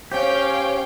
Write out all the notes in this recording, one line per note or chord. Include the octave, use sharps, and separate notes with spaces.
C#4 G4 C5 C#5 F5 G5